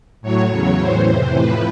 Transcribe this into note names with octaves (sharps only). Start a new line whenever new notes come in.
A2 F#3 C#5
E2 C#3 F#3 C#5
A2 E3 C5
F2 C3 E3
A2 F3 B4